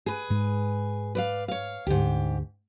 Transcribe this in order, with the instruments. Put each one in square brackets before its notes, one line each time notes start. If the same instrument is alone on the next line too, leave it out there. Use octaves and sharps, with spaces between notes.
[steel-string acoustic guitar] G#4 B4
[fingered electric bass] G#2 G#3
[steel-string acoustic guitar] B4 D5 F5
C#5 F5
[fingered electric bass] D2 D3 [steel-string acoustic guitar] G#2 G4